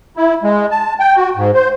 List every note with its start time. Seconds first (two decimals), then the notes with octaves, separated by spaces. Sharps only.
0.17 E4
0.43 G#3
0.71 A5
1.00 G5
1.16 F#4
1.36 G#2
1.54 C5